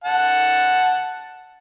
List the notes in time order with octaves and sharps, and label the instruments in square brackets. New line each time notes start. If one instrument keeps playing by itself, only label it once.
[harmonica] F#5 A5